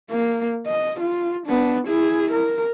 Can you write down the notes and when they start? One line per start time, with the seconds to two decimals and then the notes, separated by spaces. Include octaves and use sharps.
0.11 A#3
0.67 D#5
1.00 F4
1.47 B3 D4
1.88 E4 G#4
2.32 A#4